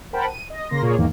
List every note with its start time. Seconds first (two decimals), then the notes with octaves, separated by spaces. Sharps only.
0.13 A#4 C5 F#5 G5 A5 B5
0.28 D#7
0.50 D#5
0.69 C#3 A#3 C6 A#6
0.82 A#2 A#3 F4 G#4 C#5
0.97 E2 G#2 D#3 E3 A#3